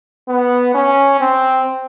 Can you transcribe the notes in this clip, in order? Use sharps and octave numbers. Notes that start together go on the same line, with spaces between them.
B3
C#4
C4